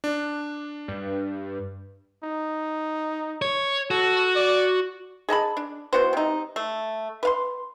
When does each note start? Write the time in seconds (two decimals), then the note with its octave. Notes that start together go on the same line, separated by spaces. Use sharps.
0.04 D4
0.88 G2
2.24 D#4
3.42 C#5
3.91 F#4 A4
4.36 D5
5.29 G#4 D#5 A5 B5
5.57 D4
5.93 E3 B3 F#4 C5
6.13 C3 D#4
6.56 A3
7.23 B4 F5 C6